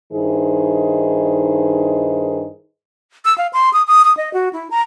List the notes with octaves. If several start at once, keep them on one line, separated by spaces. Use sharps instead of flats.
G2 D#3 D#4 E4 G#4 C5
E6
F5
C6
D#6
D#6
D#6
D#5
F#4
E4
A#5